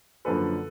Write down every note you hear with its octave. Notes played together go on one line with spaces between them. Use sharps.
F#2 D3 F3 A#3 D4 A4 B4